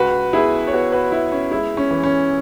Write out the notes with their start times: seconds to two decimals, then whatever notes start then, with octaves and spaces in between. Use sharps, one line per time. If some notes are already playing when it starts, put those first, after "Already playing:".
Already playing: C#2 F#4 B4
0.33 B3 E4 G#4
0.67 C#5
0.72 B3 F#4 B4
0.92 F#4 B4
1.12 B3 E4
1.32 C#4
1.51 G#3 E4
1.77 C#4
1.91 E3
2.03 C#4